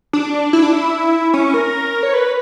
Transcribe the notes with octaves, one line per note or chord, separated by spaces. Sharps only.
D4
E4
D4
E4
C#4
A#4
C#5
B4